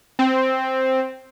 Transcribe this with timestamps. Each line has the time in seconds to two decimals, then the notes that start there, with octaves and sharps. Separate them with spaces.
0.19 C4